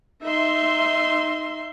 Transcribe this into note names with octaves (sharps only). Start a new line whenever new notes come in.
D#4 E5 C6